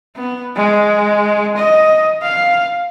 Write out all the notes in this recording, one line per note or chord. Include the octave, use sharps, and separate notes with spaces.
B3
G#3
D#5
F5